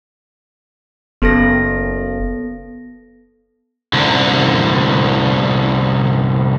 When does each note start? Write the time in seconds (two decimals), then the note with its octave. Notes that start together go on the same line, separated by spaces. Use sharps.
1.22 F#1 B3 A4 A#6
3.93 C2 D3